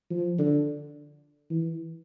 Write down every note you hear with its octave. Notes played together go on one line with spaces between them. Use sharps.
F3
D3
E3